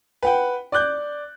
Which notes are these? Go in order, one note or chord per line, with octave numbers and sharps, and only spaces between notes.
B4 F#5 G5
D5 D6 F#6 G6